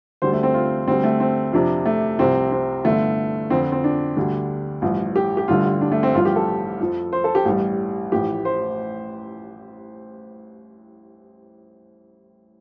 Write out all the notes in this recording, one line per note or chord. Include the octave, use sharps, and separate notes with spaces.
D2 D3 G3 C5
A3
C4
F4
D2 D3 G3 C4
A3
C4
F2 C3 F3 D4
A3
C2 C3 F3 C4
C4
G1 G2 D3 A3
F2 D3 F3 C4
C4
D4
D2 D3 G3
A1 G2 F3
G4
G4
A1 G2 D3 G3 F4
D4
A3
C4
A1 G2 F3 F4
G4
A4
F2 F3
C5
A4
G4
A1 G2 G3
A1 A2 F3 G4
C5